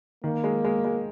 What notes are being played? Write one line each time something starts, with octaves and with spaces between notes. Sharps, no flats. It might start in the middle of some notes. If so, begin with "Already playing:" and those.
D#3 A#3
G#3
G#3
G#3